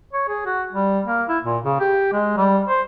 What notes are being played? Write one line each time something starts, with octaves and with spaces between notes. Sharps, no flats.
C#5
G#4
F#4
G3
A#3
E4
A#2
C#3
G4
G#3
G3
C5